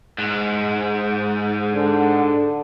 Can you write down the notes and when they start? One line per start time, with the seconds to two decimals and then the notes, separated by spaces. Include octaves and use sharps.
0.18 G#2
1.74 D3